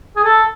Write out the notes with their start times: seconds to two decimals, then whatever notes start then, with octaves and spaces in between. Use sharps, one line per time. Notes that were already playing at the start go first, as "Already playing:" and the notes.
0.17 G#4
0.24 A4